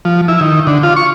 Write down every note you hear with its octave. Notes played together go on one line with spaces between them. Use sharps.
F3
E4
D#3
D3
F4
C#6